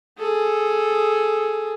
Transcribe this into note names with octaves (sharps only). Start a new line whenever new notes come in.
G#4 A4